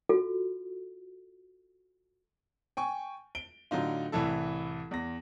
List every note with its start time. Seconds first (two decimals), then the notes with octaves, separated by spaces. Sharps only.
0.09 F4 F#4 A4
2.77 G5 G#5 C#6
3.35 D7 G7
3.71 A2 D3 F#3 D#4 F4
4.12 C2 A2 E3 E4 A4
4.91 E2 A#6